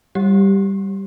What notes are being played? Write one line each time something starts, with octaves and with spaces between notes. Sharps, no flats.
G3 G4